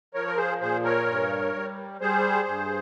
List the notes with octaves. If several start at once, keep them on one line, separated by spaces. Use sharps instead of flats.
F3 A#4 C#5
A#4
G#4 C5
A#2 G#4 C5
A#4 C#5
G2
G3
G3 G#4 C5
G2